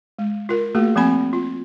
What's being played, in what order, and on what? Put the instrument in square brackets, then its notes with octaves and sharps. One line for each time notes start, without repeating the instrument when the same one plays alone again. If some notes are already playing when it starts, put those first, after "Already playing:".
[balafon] G#3
F4 A#4
A3 A#3 F#4 G#4
F3 A#3 C4 G#5 B5
F4